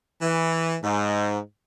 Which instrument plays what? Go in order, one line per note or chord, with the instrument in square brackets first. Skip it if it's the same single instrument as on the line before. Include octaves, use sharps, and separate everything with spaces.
[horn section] E3
G#2